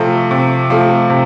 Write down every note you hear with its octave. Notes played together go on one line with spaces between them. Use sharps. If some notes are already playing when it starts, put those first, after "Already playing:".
Already playing: C3 F3 A3
C3
F3 A3
C3